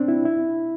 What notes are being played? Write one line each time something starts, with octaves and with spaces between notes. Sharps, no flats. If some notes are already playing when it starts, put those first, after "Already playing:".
Already playing: C4 D4
E4
E4